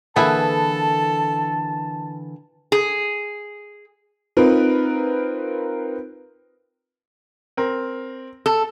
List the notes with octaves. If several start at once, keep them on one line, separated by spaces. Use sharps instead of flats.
D3 E3 A#3 E4 G#4 A4 B4 A5
G#4
C4 D#4 F4 A#4 B4
C4 A#4
A4